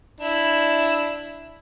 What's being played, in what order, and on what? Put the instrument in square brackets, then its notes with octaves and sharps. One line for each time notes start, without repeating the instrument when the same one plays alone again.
[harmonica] D4 E4